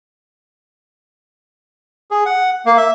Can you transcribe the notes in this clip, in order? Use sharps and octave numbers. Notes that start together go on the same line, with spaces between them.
G#4
F#5
A#3
E5